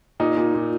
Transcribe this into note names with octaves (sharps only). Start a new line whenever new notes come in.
A#2 D#4
A#2
A#2